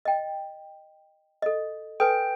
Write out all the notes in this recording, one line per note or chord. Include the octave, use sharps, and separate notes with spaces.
D#5 G5
A4 D#5
A4 B4 G5 G#5